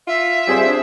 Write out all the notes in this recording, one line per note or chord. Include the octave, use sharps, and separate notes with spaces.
F4 E5
G3 C4 G#4 C5
D4